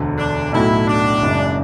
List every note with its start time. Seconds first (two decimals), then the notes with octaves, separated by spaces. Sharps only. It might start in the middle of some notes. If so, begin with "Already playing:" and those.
Already playing: E1 D2 D3
0.18 D4
0.53 B1 A2 F#3 A3 E4
0.87 D4
1.22 F#1 F#2 C#3 G#3